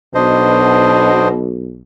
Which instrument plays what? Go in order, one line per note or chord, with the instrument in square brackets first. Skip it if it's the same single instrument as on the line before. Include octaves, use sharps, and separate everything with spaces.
[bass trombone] B1 [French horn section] B2 [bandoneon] D4 C5 D#5